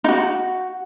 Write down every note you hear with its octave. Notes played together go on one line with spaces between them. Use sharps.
D#4 F#4